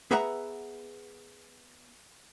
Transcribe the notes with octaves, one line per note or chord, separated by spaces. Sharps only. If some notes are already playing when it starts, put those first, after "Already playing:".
B3 G#4 B4 E5 F#5 A#5